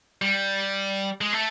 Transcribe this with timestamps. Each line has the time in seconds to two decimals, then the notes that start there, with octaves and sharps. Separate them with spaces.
0.22 G3
1.21 G#3
1.33 A3